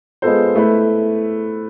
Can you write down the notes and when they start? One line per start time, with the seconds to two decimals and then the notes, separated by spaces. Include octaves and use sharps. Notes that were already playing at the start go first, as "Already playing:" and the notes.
0.22 G#3 B3 F4 A4 C5
0.55 A3 E4 B4